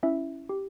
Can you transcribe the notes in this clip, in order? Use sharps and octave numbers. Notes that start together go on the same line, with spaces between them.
C#4 E4 E5
G4